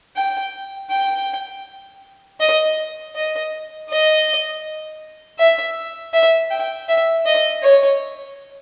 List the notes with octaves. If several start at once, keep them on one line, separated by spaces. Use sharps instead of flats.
G5
G5
D#5
D#5
D#5
E5
E5
G5
E5
D#5
C#5